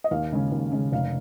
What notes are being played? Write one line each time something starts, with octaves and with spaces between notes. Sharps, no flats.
D#5
D#2 F5
C#3 G#3 C#4
D#2
C#3 G#3 C#4
F1 F5